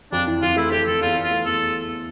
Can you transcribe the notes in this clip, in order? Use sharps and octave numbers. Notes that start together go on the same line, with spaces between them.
F2 D4
E3
F2 F4
A3 E4
A3 G4
F2 A4
E2 F4
E2
F4
A3
E2 A4